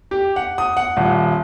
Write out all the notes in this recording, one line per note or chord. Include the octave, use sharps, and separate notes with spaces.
G4
F#5
D#6
F#5
D#1